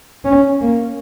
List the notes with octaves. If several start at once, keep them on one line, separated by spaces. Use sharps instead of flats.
C#4
A#3